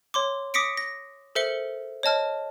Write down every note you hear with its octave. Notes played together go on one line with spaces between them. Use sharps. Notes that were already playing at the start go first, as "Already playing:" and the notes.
C#5 C6 D6
D6 D#6 A#6 B6 C#7 D7
A#6
A4 A#4 C5 E5 C#7 G7
C#5 D#5 A5 F6